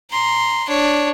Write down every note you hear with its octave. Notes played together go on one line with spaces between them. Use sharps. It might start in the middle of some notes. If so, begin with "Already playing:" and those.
A#5 C6
D4 C#5